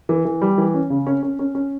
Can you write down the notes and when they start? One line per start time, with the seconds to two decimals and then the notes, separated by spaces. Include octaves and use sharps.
0.09 E3
0.25 E3
0.42 G3
0.58 E3
0.74 C#4
0.90 C#3
1.07 C#4
1.23 C#4
1.39 C#4
1.55 C#4